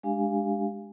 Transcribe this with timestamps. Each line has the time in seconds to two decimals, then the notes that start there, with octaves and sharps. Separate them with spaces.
0.03 G#3 D4 G4 F5 G#5